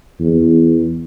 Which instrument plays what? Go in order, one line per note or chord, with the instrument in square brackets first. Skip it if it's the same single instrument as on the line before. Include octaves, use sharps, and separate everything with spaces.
[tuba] E2